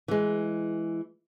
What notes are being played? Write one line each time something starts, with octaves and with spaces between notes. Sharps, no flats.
E3 G#3